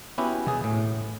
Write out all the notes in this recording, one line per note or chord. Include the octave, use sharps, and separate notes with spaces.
B3 C#4 E4 F#4 G4
B2 G#4
A2